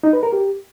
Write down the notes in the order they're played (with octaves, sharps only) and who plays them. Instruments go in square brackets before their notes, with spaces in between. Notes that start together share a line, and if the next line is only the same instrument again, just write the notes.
[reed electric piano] D#4
B4
A#4
G4